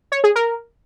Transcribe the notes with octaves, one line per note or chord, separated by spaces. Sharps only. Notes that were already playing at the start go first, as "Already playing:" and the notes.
C#5
G#4
A#4